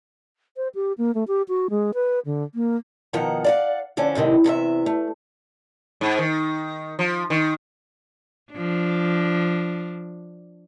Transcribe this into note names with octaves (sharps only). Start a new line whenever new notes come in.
C5
G4
A#3
A3
G4
F#4
G#3
B4
D3
A#3
B2 D#3 F3 F#5 A#5
D5 F5 F#5
D3 F3 C#4 D4
F#2 A2 C3 D#3
E2 C3 A4 E5
A3
G#2
D#3
F3
D#3
F3 D4